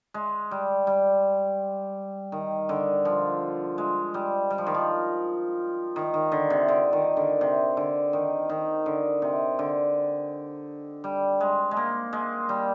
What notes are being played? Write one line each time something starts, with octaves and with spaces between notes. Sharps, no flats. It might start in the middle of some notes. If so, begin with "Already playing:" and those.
G#3
G3
G3
D#3
D3
F3
G#3
G3
G3
F3
D#3
F3
D#3
D#3
D3
C3
D3
D#3
D3
C3
D3
D#3
D#3
D3
C3
D3
G3
G#3
G#3
A#3
G#3
G3